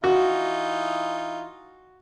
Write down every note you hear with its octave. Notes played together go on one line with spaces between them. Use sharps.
E3 D#4 F4 F#4